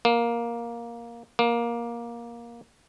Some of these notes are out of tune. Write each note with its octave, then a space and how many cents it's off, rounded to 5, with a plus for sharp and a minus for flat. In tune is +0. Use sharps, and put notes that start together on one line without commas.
A#3 +10
A#3 +15